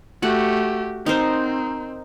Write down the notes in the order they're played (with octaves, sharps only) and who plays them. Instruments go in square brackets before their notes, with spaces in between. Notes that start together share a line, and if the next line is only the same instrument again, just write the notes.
[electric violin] A3 G4 [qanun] F#4 F#5
[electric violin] C4 [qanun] D#4 A#4 C5